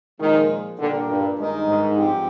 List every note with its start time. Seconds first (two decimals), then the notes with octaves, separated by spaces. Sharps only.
0.20 A#2 D#3 F3 G#3
0.79 A#2 D3 G3 D4 G4 A#4
1.09 G2
1.39 G2 D#3 G#3 D#4 A#4
1.67 G#2
1.97 G2 F3 C4 G4